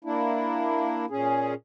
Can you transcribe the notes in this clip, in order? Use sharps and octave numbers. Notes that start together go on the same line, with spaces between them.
A#3 D4 E4
A#2 C#4 G#4